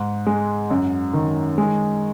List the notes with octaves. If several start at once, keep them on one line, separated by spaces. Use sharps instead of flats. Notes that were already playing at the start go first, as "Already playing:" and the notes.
Already playing: G#2
G#3
F#2
D#3
G#3